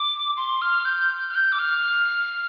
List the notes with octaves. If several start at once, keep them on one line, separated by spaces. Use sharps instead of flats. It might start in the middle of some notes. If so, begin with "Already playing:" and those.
Already playing: D6
C6
F6
G6
F6
G6
D6
F6